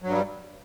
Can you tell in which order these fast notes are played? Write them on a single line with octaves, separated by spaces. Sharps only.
F#3 G2 G3